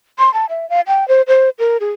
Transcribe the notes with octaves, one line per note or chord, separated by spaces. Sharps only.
C6
A5
E5
F5
G5
C5
C5
A#4
G#4